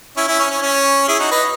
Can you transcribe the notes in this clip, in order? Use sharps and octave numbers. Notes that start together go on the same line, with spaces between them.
C#4 E4
C#4 E4
C#4
C#4
C#4
E4 G#4
D#4 F#4
B4 D#5